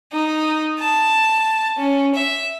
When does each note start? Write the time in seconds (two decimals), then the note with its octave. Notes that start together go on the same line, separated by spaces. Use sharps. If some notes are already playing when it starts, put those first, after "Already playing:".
0.12 D#4
0.79 A5
1.78 C#4
2.15 E5